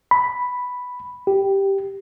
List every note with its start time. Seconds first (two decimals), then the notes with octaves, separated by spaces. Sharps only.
0.11 B5
1.27 G4